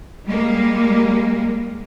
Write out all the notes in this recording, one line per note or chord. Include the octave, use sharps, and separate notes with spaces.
G3 G#3 A#3